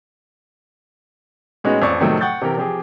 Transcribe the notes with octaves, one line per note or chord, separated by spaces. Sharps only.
A2 G#3 B3 C#4 D#4 F#4
A1 F2 F3 D5 C#6
A2 C3 D#3 F3 F#3 A3
F#5 G5 C#6 G6 A6
C3 E3 G4 A#4
F3 C4 G4 G#4